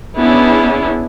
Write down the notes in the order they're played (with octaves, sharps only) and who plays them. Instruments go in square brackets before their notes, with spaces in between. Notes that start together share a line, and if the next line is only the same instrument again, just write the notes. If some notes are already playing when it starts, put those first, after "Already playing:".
[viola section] B3 C#4 D4 E4 G#4